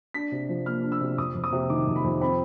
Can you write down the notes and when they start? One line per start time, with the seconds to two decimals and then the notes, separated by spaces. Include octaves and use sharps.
0.14 D4 B6
0.32 C3
0.49 F3
0.66 A#3 F6
0.83 D4
0.92 E6
1.00 C3
1.18 F2 D#6
1.35 F2
1.44 D#6
1.52 C3
1.69 D#3 D6
1.87 F2
1.96 B5
2.04 F2
2.21 C4 B5